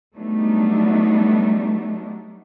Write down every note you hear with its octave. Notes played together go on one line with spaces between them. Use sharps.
F#3 G3 A3 B3 D4 D#4